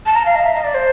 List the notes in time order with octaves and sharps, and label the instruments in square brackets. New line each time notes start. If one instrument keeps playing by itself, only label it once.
[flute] A5
A#5
F5
D#5
E5
D#5
D5
C5